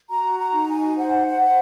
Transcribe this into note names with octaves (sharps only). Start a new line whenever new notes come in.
F#4 A#5
A#5
D#4
G#5
C5 F#5
F#5
C5